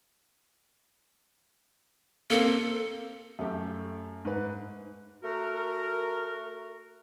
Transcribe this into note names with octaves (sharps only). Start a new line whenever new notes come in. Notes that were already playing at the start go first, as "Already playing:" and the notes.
A#3 C4 A4
F#2 A3 G4
G#2 B4
A3 F#4 A#4